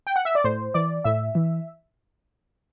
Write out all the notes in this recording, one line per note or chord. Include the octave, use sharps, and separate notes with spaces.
G5
F#5
E5
D5
A2 C5
E3 D5
A2 E5
E3